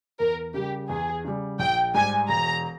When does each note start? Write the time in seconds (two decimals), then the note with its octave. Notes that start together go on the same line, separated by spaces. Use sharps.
0.19 E2 A#4
0.54 C#3 G3 G4
0.89 E2 G#4
1.25 C#3 G3
1.59 A#1 G5
1.94 G#2 G3 G#5
2.29 E1 A#5